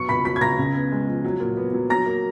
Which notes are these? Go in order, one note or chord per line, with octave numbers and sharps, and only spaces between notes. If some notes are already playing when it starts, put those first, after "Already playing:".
Already playing: B2 F#3 C#6 C#7
C#2 B5 B6
F#3 B5 B6
G#6
C#2 A#5 A#6
C#3
B3
G#3
F3
F#3
A#2
B3
F#3
F#3 A#5 A#6
A#3